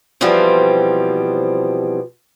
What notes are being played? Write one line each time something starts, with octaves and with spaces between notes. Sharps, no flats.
B2 E3 F3 G3 C4